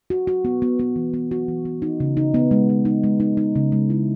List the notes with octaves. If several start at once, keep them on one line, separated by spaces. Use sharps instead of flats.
F#4
F#4
B3
B3
B3
E3
B3
F#4
E3
B3
D#4
C#3
D#4
B3
G#3
D#4
D#4
G#3
D#4
D#4
C#3
G#3
E4